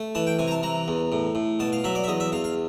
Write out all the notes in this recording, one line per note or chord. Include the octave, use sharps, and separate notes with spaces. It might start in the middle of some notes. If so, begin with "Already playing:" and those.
Already playing: A3
E3 A5
G5
C3 G#5
A#5
A5
E3 A#5
E2
A2
A2
B2 A5
F5
F#3 E5
D5
E5
E2 D#5
E5
E2 F5
F5